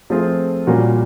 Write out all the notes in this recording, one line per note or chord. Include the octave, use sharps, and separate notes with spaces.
F3 A3 C4 F4 G#4
A#2 G3 A#3 C#4 F#4